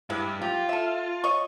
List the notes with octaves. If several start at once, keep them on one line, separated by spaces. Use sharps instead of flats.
G2 G#3 E4 B4
F4 G4
A4 E5
C#5 D#5 C#6